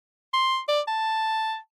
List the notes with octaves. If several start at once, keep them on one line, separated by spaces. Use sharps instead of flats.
C6
D5
A5